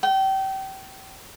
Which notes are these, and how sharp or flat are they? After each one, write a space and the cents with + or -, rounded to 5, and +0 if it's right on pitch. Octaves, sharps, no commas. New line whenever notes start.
G5 -30